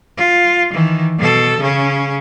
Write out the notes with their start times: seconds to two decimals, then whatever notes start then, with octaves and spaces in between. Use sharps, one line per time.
0.17 F4
0.72 D#3 E3
1.18 B2 A4
1.60 C#3 C#4